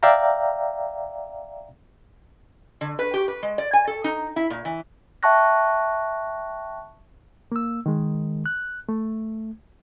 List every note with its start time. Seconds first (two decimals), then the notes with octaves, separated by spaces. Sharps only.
0.03 D5 E5 F5 G5 A#5
2.81 D3
2.99 B4
3.14 G4
3.28 B4
3.43 G#3
3.58 D5
3.73 G#5
3.87 A4
4.04 D#4
4.36 E4
4.50 A#2
4.65 E3
5.23 E5 G5 A5 C#6 F#6 A#6
7.52 A#3 E6
7.86 D#3 G#3
8.46 F#6
8.89 A3